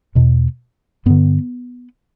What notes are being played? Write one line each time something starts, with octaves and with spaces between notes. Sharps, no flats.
E2 B2
G2 D3 B3